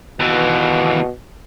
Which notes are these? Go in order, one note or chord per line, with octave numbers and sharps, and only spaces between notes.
D#2 B2 E3